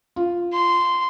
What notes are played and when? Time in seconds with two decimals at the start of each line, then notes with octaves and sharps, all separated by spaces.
0.16 F4
0.52 C6